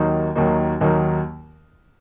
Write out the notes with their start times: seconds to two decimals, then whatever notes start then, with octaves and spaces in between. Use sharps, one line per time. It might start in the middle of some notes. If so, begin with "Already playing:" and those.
Already playing: D#2 D#3 F#3 A#3 D#4
0.35 D#2 D#3 F#3 A#3 D#4
0.81 D#2 D#3 F#3 A#3 D#4